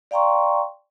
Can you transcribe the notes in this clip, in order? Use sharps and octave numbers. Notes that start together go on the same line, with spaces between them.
D5 F5 G5 A#5 C6 C#6